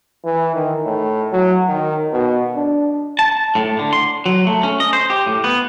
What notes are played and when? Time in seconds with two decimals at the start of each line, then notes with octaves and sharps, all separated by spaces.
0.25 E3
0.55 D#3
0.86 A2
1.32 F#3
1.69 D#3
2.13 B2
2.55 D4
3.19 A5
3.55 A2
3.79 D3
3.93 C6
4.26 F#3
4.47 A3
4.63 C#4
4.80 D#5
4.93 C5
5.10 G4
5.26 A2
5.44 B3